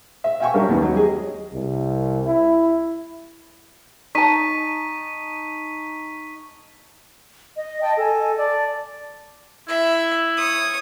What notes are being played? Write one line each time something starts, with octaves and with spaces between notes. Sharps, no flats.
E5
E5 F5 G5 G#5 C#6
F#3 G3 D4 A#4
D#2 B3
F#3 D#5
G4 G#4 D#5
C2
E4
D#4 A5 C#6 B6 D#7
D#5
D#5 G5 A5
A4 G#5
D5 A5
E4 E5
C#5 D#6